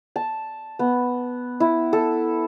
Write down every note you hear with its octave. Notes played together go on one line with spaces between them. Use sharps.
A5
B3
E4
A4